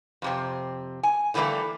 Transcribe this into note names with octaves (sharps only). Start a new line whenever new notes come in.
F2 C3 C4
G#5
A2 D3 E3 G3 A3 A#3